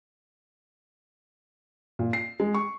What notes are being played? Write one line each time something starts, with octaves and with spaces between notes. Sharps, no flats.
A#2
C7
G#3
C#6